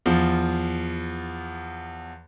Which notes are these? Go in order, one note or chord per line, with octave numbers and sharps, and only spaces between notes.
E2 F3